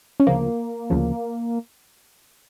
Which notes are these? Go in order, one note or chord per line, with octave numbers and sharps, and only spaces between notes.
C#4
D2 C#3 F3 A#3
D2 C#3 F3